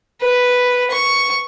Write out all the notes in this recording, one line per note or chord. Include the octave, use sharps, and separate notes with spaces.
B4
C#6